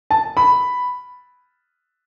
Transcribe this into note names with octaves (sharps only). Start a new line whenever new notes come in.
A5
B5